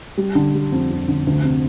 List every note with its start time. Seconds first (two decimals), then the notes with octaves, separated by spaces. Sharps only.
0.17 G3
0.35 D3
0.54 G3
0.72 F2
0.91 F2
1.08 D3
1.27 D2
1.44 C3